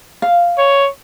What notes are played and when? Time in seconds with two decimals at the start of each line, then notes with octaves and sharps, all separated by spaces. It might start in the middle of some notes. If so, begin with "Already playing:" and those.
0.22 F5
0.58 C#5